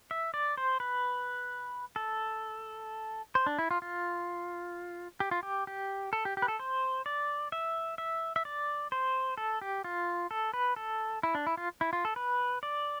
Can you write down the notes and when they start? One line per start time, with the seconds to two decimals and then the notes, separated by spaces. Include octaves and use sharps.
0.11 E5
0.34 D5
0.57 C5
0.80 B4
1.96 A4
3.35 C5
3.46 D4
3.59 E4
3.71 F4
3.82 F4
5.20 G4
5.31 F4
5.43 G4
5.67 G4
6.13 A4
6.25 G4
6.37 G4
6.42 B4
6.48 A4
6.60 C5
7.06 D5
7.52 E5
7.98 E5
8.36 E5
8.45 D5
8.92 C5
9.38 A4
9.62 G4
9.84 F4
10.31 A4
10.54 B4
10.76 A4
11.23 E4
11.35 D4
11.47 E4
11.57 F4
11.81 E4
11.93 F4
12.05 A4
12.16 B4
12.63 D5